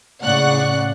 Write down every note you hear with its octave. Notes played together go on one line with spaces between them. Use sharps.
A2 C#3 D5 F#5 C#6 F#6